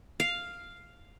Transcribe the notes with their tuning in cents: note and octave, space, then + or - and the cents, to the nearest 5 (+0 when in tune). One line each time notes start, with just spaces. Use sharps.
F5 +0